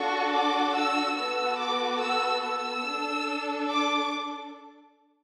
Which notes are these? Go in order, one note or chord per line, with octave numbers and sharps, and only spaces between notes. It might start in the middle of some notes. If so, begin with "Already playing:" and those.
Already playing: D4 F#4 A4 C#6
D6
E6
B3 F#4 A4 E6
D6
E6
E6
D4 A4
D6